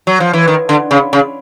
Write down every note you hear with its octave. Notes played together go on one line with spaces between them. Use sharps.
F#3
F3
E3
D#3
D3
C#3
C#3